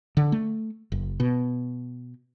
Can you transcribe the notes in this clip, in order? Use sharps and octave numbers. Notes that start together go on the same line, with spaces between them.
D3
A3
F#1
B2